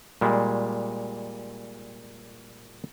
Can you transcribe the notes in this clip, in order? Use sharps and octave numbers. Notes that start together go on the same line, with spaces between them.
A#2 G3 G#3